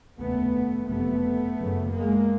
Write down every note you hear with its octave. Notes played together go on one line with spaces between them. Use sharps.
F1 D#2 C#3 A3 B3
F#1 F2 C3 A3 B3
F#1 F#2 C#3
G#3 A#3